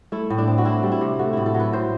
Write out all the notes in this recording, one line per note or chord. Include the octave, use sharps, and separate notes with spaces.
A3 E4
A2
D4
C4
F#4
C4 E4
G3
E4
C3
A3 F#4
A2 E4
A4
F#3
B4
A2 C5